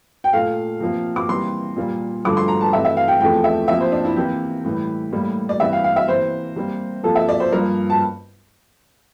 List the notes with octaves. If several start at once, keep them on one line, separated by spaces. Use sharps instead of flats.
G5
A#2 A3 F5
C3 F3 A#3
D6
C3 E3 G3 A#3 C6
A#2 G3 A#3
G2 D3 F3 A3 D6
C6
A#5
A5
C3 E3 A3 E5
E5
F5
G5
E2 C3 F3 A3 G5
E5
C3 F3 A#3 E5
C5
D4
E4
C3 E3 A#3 G4
A2 E3 G3
A2 G3 A#3
D5
C3 E3 G3 A#3 E5
F5
F5
E5
C3 E3 A#3 C5
C3 G3 A#3
C3 F3 A#3 A4
E5
D5
C5
G2 F3 A#3 A#4
A5